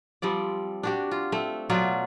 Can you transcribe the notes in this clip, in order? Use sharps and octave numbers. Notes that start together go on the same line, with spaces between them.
F3 G3 C4 D5
D4 F#4 G4
F4
A3 C4
B2 F#3 F4 D5